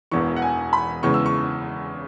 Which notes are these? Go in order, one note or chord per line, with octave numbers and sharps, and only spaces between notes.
E1 E2 E3 C#6
F#5
G#5
B5
E2 C#3 E3 G#3 C#6
E6
C#6